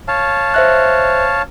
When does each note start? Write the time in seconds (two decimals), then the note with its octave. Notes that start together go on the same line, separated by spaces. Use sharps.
0.08 C#5 F5 A5
0.54 C5 E5 F#6